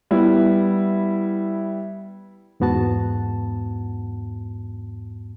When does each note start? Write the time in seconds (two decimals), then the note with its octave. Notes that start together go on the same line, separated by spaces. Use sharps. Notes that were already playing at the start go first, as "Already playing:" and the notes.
0.11 G3 B3 E4
2.60 E2 G#2 B3 F#4 A5